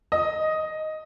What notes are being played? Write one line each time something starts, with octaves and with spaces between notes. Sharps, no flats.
D#5